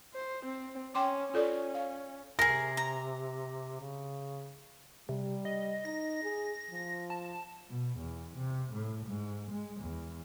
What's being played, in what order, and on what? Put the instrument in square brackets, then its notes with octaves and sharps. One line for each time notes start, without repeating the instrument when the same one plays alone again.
[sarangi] C5
C4
[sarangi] C#4 [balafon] G5 C6 D6
[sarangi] C#4 [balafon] F4 A4 D5
[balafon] F5
[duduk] C3 [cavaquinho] G#4 A#4 [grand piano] A#6
[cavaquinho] A#5
[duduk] C#3
[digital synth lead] C3 [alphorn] G3
[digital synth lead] D#5
[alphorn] D#4 [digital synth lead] A#6
[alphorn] G#4
F3
[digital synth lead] A5
[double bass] B2
E2
C3
A2
G#2
G#3
E2